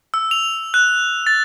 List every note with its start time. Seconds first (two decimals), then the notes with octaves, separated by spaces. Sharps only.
0.14 E6
0.31 F7
0.74 F#6
1.27 A6